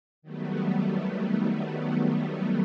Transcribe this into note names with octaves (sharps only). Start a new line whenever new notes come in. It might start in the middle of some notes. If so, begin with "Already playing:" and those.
D#3 F#3 G3 A3 B3